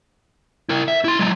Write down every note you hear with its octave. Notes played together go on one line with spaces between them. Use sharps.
E4 A#4
E5
E4 C6
F#3 G#3